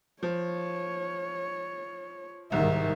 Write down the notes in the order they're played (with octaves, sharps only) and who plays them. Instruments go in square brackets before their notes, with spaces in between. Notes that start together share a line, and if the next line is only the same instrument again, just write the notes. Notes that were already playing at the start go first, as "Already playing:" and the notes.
[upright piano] F3 [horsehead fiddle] C#5
[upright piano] C2 [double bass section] G#2 D#3 [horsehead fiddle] E5